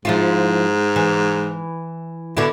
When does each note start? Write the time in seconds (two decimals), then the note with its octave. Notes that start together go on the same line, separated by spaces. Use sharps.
0.05 G#2 F3 E4 F4
0.96 E3
2.37 B2 D3 E4